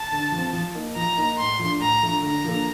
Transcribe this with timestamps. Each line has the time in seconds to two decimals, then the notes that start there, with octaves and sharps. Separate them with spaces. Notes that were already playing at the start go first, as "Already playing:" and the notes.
Already playing: A5
0.12 D3
0.32 F3 C4
0.53 F3
0.75 A#3 D#4
0.96 F3 A#5
1.17 A#3 D#4
1.38 A2 C6
1.59 F3 A3 D4
1.80 A2 A#5
2.02 F3 A3 D4
2.23 D3 A#5
2.44 F3 A#3 D4 A4